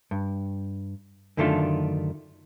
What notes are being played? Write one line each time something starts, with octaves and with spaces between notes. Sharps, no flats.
G2
F#2 D3 D#3 A3 D4 F4